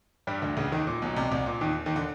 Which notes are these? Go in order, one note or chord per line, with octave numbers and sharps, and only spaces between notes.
G2 G3
D2 D3
C#2 C#3
D#2 D#3
A#2
B1 B2
C2 C3
C2 C3
A#2
D#2 D#3
D#2 D#3
D3